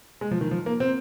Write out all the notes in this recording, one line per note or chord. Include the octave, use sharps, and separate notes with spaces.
G#3
F3
D#3
F3
A#3
C4